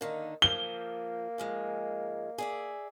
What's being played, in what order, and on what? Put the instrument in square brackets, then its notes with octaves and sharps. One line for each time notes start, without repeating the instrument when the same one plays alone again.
[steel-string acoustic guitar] D3 D#3 D#4 [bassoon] A#3
[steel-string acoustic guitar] F3 [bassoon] A#3 [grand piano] G7
[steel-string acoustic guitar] G#2 F3 G#3
G#4 D5 E5